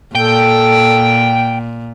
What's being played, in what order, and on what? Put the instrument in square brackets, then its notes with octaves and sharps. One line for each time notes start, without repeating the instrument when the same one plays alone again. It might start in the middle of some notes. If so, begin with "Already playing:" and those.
[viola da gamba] A#2 [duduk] A4 [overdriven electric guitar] G5